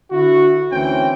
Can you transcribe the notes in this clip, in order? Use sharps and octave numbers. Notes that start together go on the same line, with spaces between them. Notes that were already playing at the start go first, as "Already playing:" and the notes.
D3 E4 F#4
D2 E3 C4 C#4 G5